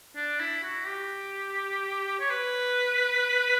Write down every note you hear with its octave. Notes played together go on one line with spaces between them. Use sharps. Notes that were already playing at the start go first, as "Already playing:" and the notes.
D4
E4
F#4
G4
C#5
B4